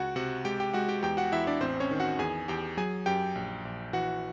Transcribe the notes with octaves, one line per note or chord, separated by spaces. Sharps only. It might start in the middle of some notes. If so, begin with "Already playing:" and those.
Already playing: C#2 F#4 F#5
C3 F#4 F#5
G#3 G4 G5
G4 G5
G#3 F#4 F#5
G4 G5
E2 G4 G5
F#4 F#5
E2 E4 E5
D4 D5
A1 C4 C5
C#4 C#5
D#3
F#4 F#5
E2 G#4 G#5
E2 G4 G5
F#3 G#4 G#5
F#2 G4 G5
A#1
A#1
E3 F#4 F#5